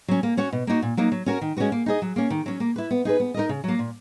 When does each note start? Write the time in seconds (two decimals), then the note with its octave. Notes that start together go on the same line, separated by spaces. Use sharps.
0.08 F#3 C#4
0.23 A#3
0.37 C#4 F#4 C#5
0.52 B2
0.67 A#3 D#4 F#4
0.82 A#2
0.97 F#3 A#3 D#4
1.12 F#3
1.26 C#4 F#4 A#4
1.41 D#3
1.56 G#3 C#4 F#4 B4
1.72 A#3
1.86 D#4 G#4 D#5
2.02 F#3
2.16 A#3 C#4
2.30 D#3
2.46 F#3 C#4
2.60 A#3
2.76 E4 B4
2.91 B3
3.05 D#4 G#4 B4
3.20 B3
3.34 D#4 A#4 D#5
3.49 C#3
3.64 F#3 A#3
3.79 A#2